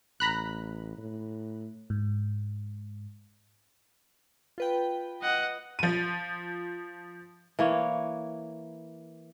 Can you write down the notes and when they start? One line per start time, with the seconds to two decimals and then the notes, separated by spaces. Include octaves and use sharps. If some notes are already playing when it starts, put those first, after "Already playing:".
0.20 A1 A#5 B5 F#6
0.98 A2
1.90 G#2
4.58 F4 B4 G5
5.22 D#5 F#5
5.79 F3 D#7
7.59 E3 A#3 C#5